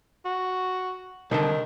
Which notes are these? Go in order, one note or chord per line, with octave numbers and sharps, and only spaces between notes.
F#4
C2 D3 D#3